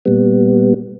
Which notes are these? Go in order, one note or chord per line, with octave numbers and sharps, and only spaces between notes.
A#2 G3 B3